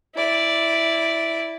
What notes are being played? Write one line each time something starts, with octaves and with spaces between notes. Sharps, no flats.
E4 D5